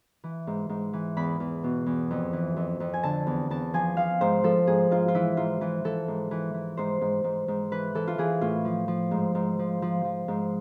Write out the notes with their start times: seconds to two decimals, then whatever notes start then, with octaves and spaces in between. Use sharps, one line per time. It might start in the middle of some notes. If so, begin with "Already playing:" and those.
0.24 E3
0.47 G#2
0.69 G#2
0.93 E3
1.16 E2 B5
1.40 E2
1.64 B2
1.86 E2
2.11 F2
2.33 E3
2.56 F2
2.80 F2
2.93 G#5
3.03 D3 A5
3.27 E2
3.50 E2 A5
3.74 F3 G#5
3.97 F3 F5
4.21 G#2 C5
4.44 F3 A4
4.67 G#2 G#4
4.91 G#2 F4
5.08 F4
5.14 E3 E4
5.37 G#2 F4
5.61 E3 F4
5.84 E3 A4
6.08 G#2
6.31 E3
6.54 E3
6.77 G#2 C5
7.01 G#2
7.24 G#2
7.48 G#2
7.71 E3 B4
7.95 E3 A4
8.07 F4
8.18 E3 G#4
8.41 A2 F4
8.65 F3
8.88 F3
9.11 G#2
9.35 G#2
9.59 F3
9.82 F3
10.05 F3
10.28 G#2